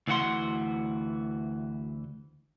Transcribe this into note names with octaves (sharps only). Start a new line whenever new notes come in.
D2 E3 F#4 F#5 C6